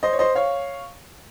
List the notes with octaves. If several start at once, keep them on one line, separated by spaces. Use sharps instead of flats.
C5 D#5
C#5
C5 D#5
C#5 F5